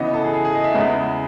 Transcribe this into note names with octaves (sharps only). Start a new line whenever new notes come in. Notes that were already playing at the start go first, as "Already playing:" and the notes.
Already playing: C#3 E3 B3 D#5
A4
G#4
G#4
G#4
D#5
E5
E2 C#3 G#3 B3